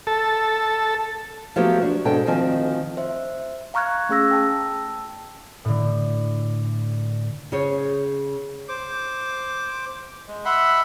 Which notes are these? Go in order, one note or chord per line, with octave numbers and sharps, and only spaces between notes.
A4
F3 F#3 A3 B3 G4
D4 F#4
G#2 B2 C#4 D4 A4 G5
D2 D#3 F3 C4 G#5
C5 E5
F5 A#5 C#6 F6 F#6 G#6
A3 C#4 G#4 F5 E6 A#6
G5 A5 E6
A2 D3
C#3 G#4 C5 C#5
C5 D6
G#3
E5 F#5 B5 C6